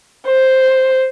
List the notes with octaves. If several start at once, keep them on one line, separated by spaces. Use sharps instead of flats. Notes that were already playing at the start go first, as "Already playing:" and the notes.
C5